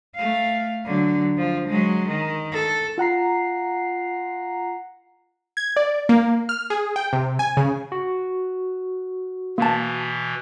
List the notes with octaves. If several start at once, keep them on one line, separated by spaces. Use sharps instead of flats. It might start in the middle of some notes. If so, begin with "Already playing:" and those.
A3 F5
D3 F#3
F3
F#3 G#3
D#3
A4
F4 F#5 A#5 C7
G#6
D5
A#3
F6
G#4
G5
C3
G#5
C#3
F#4
B2 E3 A#3 A5